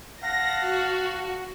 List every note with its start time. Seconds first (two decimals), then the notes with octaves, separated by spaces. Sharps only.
0.22 F5 F#5 A5 A#6
0.63 F#4